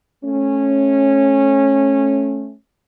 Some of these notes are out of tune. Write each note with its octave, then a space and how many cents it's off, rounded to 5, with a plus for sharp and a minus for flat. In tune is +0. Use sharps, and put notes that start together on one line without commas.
A3 -20 C#4 -15